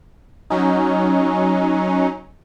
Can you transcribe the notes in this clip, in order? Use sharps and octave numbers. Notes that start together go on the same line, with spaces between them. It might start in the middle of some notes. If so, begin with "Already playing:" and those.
F#3 C#4 D#4